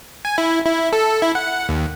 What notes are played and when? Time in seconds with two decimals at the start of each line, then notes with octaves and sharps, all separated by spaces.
0.25 G#5
0.38 E4
0.66 E4
0.93 A4
1.22 E4
1.35 F#5
1.69 D#2